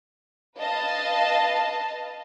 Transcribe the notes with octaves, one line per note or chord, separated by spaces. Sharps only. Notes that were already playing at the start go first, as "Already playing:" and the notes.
B4 D#5 F5 A5